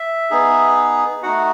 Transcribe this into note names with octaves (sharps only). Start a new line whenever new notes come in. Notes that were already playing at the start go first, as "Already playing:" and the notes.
Already playing: E5
B3 D#4 G#4
A3 D#4 F#4 F#5